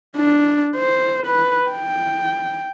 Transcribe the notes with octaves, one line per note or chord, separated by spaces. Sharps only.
D4
C5
B4
G5